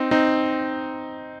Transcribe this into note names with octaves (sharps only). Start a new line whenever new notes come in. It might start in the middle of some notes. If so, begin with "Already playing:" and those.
Already playing: C4 D#4
C4 D#4